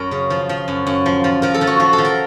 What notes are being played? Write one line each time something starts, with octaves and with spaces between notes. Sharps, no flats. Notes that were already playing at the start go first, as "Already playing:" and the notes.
Already playing: F#2 A#4
C#3
F3
F3
F#2
F#2
F3
F3
F3 A#4
A4
F3
F#4
F3 F#4
A4
F3
A#4